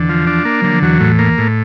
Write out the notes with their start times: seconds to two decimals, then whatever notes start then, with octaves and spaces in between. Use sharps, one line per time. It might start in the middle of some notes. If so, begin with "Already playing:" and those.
Already playing: E2 D3 E3
0.09 F3
0.27 D4
0.45 A#3
0.62 D3 F#3
0.71 F3
0.82 E2 E3 F#3
1.00 A2
1.19 A#3
1.38 A2